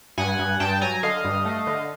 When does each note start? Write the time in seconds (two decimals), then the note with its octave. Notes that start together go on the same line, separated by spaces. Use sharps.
0.18 G2 F#5 G#5
0.39 G2
0.60 G2 G5 A5
0.82 F#3 G#5 A#5
1.03 D3 D#5 F5
1.24 G2
1.45 A3
1.67 D3